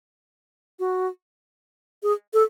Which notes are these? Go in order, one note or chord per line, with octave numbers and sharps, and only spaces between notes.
F#4
G#4
A4